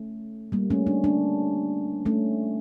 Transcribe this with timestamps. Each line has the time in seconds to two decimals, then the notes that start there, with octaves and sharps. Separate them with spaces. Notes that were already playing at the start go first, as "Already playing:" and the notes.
Already playing: A3 C#4
0.52 G3 A#3
0.70 A3 C#4
0.87 D4
1.04 A#3 D4
2.06 A3 C#4